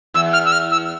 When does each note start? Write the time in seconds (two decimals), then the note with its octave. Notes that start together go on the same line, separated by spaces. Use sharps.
0.14 E2 E6
0.33 F6
0.45 E6
0.52 F6
0.71 E6